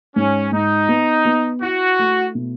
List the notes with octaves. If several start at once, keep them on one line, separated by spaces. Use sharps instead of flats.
G#2 C#4
G#2 D#4
B3
B3
E4 F#4
A3
B2